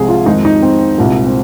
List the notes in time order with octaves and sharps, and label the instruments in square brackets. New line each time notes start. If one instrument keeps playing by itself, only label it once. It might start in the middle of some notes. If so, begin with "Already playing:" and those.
Already playing: [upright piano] C2 C3 F3 G#3 G#4
F4
F2 D#3 G#3 D#4
D#4
C4
C2 A#2 G#3
C4